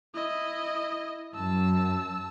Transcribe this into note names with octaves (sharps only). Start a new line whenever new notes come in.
E4 D#5
F#2 A5 E6